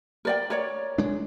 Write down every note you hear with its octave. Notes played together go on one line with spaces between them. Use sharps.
A#4 D5 G5
A#4 C#5 D5
G#3 D4